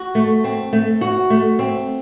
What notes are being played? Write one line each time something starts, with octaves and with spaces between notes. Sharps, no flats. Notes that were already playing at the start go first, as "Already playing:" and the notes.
Already playing: F#4
A3
C4
A3
F#4
A3
C4